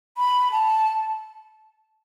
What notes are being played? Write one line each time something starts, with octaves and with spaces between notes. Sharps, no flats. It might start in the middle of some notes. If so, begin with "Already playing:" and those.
B5
A5